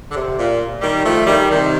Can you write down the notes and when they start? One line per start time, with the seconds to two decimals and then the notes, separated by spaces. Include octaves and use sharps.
0.11 D3
0.16 C3
0.39 A#2
0.82 D#3 G3
1.05 F3 A3
1.27 D#3 G3
1.50 C3 D#3